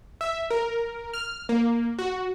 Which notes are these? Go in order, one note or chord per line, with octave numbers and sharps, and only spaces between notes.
E5
A#4
F6
A#3
F#4